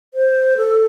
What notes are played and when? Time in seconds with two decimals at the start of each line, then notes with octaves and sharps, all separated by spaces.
0.14 C5
0.57 A4